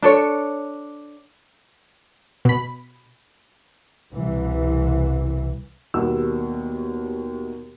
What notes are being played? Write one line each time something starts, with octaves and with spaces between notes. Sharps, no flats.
D4 A4 C#5
B2 B5
C2 B2 E3
D#2 B2 G3 F#4 E6